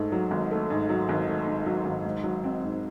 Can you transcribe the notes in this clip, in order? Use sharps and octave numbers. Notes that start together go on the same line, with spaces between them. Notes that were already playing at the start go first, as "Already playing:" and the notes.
Already playing: G#2 A3
F#3
G#1
A3
G#2
F#3
G#1
A3
G#2
F#3
G#1
G#2
F#3
C4
G#2